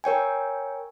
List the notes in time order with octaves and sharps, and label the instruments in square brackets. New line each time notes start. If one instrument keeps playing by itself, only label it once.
[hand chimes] A#4 C#5 G5 G#5